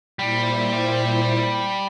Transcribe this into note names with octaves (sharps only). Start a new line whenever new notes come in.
A#2 G3 E4 C5